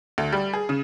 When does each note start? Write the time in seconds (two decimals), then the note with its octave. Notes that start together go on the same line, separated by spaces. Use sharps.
0.18 D2
0.32 G3
0.53 G#4
0.69 C#3